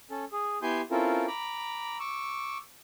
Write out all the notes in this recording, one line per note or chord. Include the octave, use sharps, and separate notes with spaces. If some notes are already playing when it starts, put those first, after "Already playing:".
C#4 A4
G#4
B3 E4 G4 G#5 C6 G6
C4 C#4 E4 F4 A4 A#4
A#5 B5 D6
C#6 D6 E6